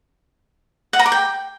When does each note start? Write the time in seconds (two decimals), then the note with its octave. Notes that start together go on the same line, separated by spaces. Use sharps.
0.93 F#5
0.99 A#5
1.06 D6
1.12 G5